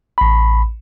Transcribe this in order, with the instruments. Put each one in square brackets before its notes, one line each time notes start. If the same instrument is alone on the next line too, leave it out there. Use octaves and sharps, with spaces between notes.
[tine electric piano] A1 B5